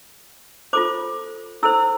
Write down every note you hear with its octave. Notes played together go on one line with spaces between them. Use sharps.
F4 A4 C5 D6
E4 A4 C5 E6